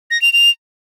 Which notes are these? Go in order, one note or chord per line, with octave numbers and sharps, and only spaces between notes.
A#6
F7
F7